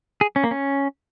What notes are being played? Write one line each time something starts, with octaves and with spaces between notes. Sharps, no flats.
G#4
C#4
A#3
C#4